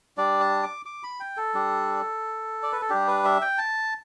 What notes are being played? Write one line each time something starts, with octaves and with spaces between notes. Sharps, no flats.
G3 D4 D5
A5
D6
D6
B5
G5
A4
G3 D4
D5
B4
A4
G3 D4 G4
B4
E5
G5
A5